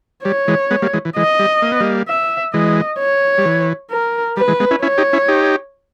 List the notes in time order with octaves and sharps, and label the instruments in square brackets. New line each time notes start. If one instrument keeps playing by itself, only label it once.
[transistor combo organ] G3 [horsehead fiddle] C#5
[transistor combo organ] E3 G#3
G#3 B3
G3 A#3
E3 G#3
E3
[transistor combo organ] E3 G#3 [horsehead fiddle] D#5
[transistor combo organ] G3
A#3
B3
G3 A#3
[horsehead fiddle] E5
[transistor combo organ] E3 G#3 [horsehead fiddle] D#5
[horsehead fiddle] C#5
[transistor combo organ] G3
E3
[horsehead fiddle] A#4
[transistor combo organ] G3 [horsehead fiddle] B4
[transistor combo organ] E3 G#3
G#3 B3
C#4 E4
[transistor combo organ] C#4 E4 [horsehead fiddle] C#5
[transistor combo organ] D#4 G4
C#4 E4
D#4 G4